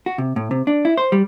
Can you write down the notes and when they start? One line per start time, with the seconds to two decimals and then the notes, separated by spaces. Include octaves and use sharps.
0.06 F#4
0.18 C3
0.36 A2
0.51 C3
0.67 D4
0.85 E4
0.97 C5
1.12 G3